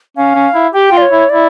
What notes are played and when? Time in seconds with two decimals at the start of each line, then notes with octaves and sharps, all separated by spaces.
0.17 C#4 F5
0.35 C#4
0.54 E4
0.73 G4 G5
0.92 F4
0.97 D5
1.02 C#5
1.11 E4
1.29 E4 D5